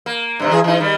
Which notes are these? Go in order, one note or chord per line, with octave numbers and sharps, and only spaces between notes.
A#3
G2 C3 D#3
E3 G#4
E3 D#4
D#3 G3